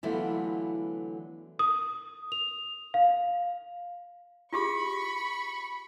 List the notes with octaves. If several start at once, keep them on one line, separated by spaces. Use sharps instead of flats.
D3 E3 F#3 A3 B3 F4
D#6
F7
F5
F4 G4 G#4 B5 C#6